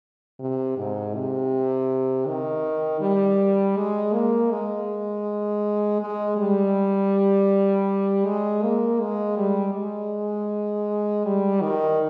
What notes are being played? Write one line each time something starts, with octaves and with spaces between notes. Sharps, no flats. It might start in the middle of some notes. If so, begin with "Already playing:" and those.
C3
G#2
C3
D#3
G3
G#3
A#3
G#3
G#3
G3
G#3
A#3
G#3
G3
G#3
G3
D#3